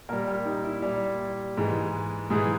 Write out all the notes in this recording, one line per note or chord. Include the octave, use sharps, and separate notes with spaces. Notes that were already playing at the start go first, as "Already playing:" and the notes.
A#2 G3 A#4
G4
D#4
E4
A#2 G3 G4
G#2 E3 G#3
G#2 E3 G#3 G#4